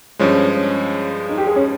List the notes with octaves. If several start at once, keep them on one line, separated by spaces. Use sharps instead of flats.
G2 F3 G#3 C#4
C#4
D#4
G4
G#4
C#4